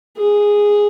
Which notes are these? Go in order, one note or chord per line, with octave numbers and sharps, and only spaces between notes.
G#4